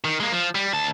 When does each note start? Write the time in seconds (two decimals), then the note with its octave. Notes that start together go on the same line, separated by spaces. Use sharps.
0.04 D#3
0.20 G#3 A#3
0.32 F3
0.55 G3
0.74 D2 A5